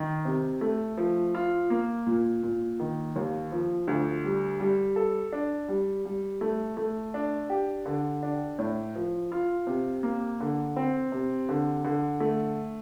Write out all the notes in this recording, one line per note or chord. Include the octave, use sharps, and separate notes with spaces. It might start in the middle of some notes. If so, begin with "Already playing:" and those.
Already playing: D#3
C3
A3
F3
F4
A#3
A#2
A#2
D#3
D#2
F3
D2
G3
G3
A4
D4
G3
G3
A3
A3
D4
G4
D3
D4
A2
F3
F4
C3
A#3
D3
C4
C3
D3
D3
A3